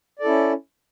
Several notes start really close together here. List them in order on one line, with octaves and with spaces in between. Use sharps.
D5 A4 E4 C#4